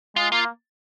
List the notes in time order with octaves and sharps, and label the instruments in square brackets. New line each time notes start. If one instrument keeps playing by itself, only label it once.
[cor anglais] G#3 [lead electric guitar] F4
[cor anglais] A#3 [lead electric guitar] F4